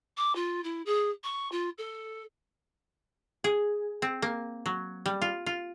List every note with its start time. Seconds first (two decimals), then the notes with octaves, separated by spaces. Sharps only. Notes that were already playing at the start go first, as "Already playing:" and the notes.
0.17 D6
0.35 F4
0.64 E4
0.86 G#4
1.24 C#6
1.52 F4
1.78 A4
3.44 G#4
4.02 C4
4.22 A#3
4.66 F#3
5.06 G3
5.22 F4
5.46 F4